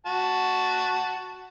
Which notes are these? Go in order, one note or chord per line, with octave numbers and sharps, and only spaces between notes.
F#4 A5